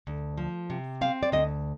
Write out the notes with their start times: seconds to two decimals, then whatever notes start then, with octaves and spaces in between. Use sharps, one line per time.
0.07 D2
0.38 F3
0.70 C3
1.01 C4 F5
1.23 D5
1.32 D2 D#5